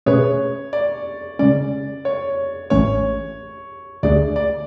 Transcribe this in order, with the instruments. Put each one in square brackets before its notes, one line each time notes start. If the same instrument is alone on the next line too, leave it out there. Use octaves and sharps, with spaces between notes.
[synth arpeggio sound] B2 A3 C#4 G#4 B4 [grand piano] C#5
[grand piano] D5
[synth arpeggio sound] C#3 G#3 C#4 [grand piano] D5
[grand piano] C#5
[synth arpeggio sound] A1 A2 E3 A3 C#4 [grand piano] C#5
[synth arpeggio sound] D2 D3 A3 D4 G#4 [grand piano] D5
[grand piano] D5